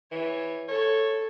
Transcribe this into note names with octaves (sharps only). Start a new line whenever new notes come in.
E3 C#5
A4 C#5